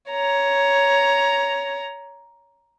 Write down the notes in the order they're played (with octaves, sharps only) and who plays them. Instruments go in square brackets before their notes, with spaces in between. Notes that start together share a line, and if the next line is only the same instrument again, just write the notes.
[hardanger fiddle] C#5 A#5